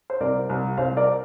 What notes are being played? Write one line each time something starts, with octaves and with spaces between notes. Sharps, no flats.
C5
C2 A#4 D5
C2
C2 C5 F5
A#4 D5